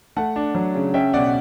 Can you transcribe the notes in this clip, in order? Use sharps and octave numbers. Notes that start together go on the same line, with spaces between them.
A3 F#5 A5
D4
F#3
C#3
C#4 E5 G5
B2 D5 F#5
F#5